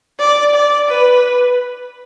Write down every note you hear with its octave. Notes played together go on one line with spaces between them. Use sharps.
D5
D5
B4